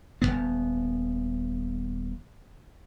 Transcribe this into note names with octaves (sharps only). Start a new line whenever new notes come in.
D#1 D#2 B3